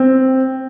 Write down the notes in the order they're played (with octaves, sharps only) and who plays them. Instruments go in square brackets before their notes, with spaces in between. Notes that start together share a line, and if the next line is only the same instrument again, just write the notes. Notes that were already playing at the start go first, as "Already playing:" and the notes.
Already playing: [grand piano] C4